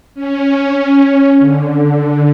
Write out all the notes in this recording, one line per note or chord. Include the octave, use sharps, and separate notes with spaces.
C#4
D3